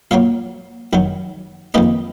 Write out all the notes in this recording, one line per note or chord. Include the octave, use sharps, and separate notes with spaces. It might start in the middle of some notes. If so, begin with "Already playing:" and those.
A#2 F#3 A#3 C#5 F5
F#2 D#3 F#3
F2 D#3 A#3 B4 D#5